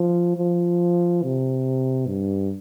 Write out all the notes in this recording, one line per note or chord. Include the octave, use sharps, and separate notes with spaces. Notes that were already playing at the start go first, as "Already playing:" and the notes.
Already playing: F3
F3
C3
G2